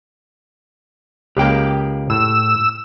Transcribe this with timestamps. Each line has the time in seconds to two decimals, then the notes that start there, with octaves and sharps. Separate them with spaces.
1.37 C#2 A#3 G4 G#4 G5
2.10 A2 E6